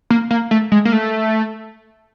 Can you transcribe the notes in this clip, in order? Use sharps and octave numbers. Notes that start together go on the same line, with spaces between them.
A#3
A#3
A3
G#3
A#3
A3